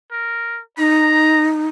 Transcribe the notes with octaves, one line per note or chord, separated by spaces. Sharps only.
A#4
D#4 A#5